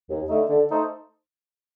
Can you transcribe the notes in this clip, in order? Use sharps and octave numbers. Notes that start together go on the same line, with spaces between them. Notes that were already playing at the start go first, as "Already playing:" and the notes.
D#2
D3 A3 D#4
D3
A3 D#4 A4 C5